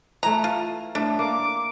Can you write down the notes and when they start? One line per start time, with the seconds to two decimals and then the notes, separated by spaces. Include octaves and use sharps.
0.23 E3 A3 A#5
0.44 F4
0.95 A2 A3 D4
1.19 A#3 D6